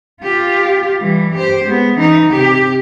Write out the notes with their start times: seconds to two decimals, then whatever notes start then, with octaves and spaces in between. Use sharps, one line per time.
0.23 F4 G4
1.00 E3 G3
1.35 G4 C5
1.65 G#3 B3
1.96 E3 D#4
2.30 C3 G4